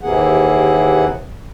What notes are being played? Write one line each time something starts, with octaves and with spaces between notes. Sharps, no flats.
D#2 C3 E3 A#3 G#4 F#5